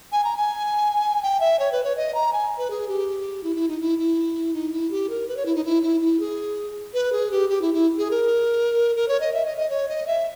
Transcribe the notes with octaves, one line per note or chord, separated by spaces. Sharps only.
G#5
A#5
G#5
G5
E5
C#5
B4
C#5
D#5
A#5
G#5
B4
G#4
G4
E4
E4
D#4
E4
E4
D#4
E4
G4
A#4
B4
C#5
E4
D#4
E4
E4
E4
G#4
B4
G#4
G4
G4
E4
E4
G#4
A#4
A#4
C#5
D#5
E5
D#5
D#5
C#5
D#5
E5